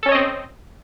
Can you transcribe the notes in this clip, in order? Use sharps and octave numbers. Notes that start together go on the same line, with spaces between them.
C4 C#4 A4 C#5 D#5